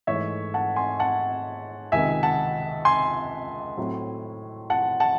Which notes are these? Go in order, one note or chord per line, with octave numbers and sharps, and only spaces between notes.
G#2 E3 A3 C#5 E5
F#5 A5
G#5 C6
F#5 A5
C#2 C3 D#3 E5 G#5
F#5 A5
G#5 C6
A2 F#3 A3 C4 E4
F#5 A5
F#5 A5